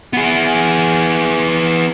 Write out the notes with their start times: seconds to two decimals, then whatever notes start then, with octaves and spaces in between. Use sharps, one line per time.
0.13 B3 G#4